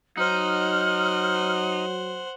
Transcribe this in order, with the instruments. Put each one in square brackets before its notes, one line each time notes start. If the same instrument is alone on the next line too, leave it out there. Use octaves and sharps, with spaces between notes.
[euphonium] F#3 [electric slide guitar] D#4 [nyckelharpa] C5 F#5 [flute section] F6